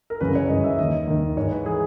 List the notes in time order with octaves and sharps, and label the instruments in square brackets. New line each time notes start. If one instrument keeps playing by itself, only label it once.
[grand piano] A#4
F#2 C#3 E3 B4
C#5
F#2 C#3 E3 D#5
E5
D#2 D#3 D#5
D#2 D#3
G#2 E3 C#5
B4
E3 G#4